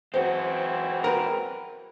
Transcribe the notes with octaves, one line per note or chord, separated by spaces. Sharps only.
E3 F#3 G#3 C4 F#4 C5
A#4 B4